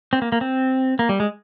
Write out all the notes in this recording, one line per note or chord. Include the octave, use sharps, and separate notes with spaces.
C4
A#3
A#3
C4
A#3
G3
G#3